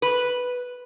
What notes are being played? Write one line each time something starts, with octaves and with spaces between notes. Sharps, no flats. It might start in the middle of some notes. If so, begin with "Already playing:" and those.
B4